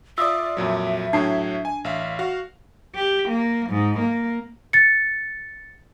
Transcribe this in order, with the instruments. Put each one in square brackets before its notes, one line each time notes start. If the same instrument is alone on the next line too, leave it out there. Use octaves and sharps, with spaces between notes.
[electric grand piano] F4 D5 [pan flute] E5 [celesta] D#6 E6
[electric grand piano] F2 A#2 F#3
[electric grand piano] A2 F#3 G#6 [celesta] D4 A5 C7
[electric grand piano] G#5
A1 E5 F5
F#4 F5
[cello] G4
A#3
G#2
A#3
[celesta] A6 C#7